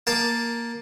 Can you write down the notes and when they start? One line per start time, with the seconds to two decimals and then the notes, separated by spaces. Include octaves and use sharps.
0.07 A#3 A5 D6